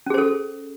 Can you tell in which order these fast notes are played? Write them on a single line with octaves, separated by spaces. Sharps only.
C#4 G#4 C5 A4